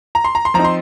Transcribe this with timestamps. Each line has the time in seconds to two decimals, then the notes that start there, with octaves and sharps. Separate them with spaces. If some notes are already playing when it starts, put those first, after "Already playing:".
0.15 A#5
0.25 C6
0.35 A#5
0.45 C6
0.54 F3 C4 D#4 A#5
0.65 C6